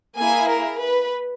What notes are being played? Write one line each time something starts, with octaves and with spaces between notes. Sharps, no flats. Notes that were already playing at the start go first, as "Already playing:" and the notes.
A#3 E4 G#4 G#5
A#4
B4